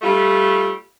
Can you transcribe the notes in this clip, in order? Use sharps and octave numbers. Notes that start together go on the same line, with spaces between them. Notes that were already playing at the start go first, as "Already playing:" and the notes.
G3 A3 F4